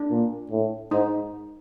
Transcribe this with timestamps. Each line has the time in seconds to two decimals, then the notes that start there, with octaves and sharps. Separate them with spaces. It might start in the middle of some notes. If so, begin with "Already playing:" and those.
Already playing: D4
0.10 A#2
0.51 A2
0.91 G#2 D#4